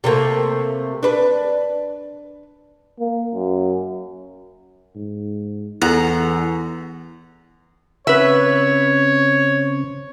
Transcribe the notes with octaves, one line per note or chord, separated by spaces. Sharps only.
C3 A3 A#3
D4 B4
A#3
F#2
G#2
E2 E3 E4 A4 F#5 A#5
C#3 C4 C#4 B4 C#5 E5